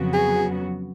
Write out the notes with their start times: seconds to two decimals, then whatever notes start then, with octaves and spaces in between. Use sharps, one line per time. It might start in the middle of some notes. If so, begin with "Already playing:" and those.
Already playing: F2 C#3 F#3 B3 F#4
0.13 G#4